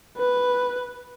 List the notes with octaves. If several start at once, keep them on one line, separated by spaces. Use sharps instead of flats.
B4